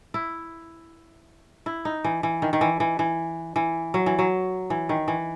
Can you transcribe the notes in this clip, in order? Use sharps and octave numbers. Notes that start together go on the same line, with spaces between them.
E4
E4
D#4
E3
E3
D#3
D#3
E3
E3
E3
E3
F#3
E3
F#3
E3
D#3
E3